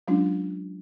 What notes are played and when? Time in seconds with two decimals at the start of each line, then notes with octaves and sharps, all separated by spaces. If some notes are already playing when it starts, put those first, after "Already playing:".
0.08 F#3 G#3 C#4 D4 F4